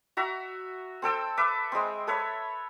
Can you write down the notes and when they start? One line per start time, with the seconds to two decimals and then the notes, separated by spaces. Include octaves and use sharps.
0.17 F#4 E5 A#5
1.02 C4 A4 G5 E6
1.37 B4 E5 D6
1.72 G#3 C4
2.07 A4 B4 C#5 E5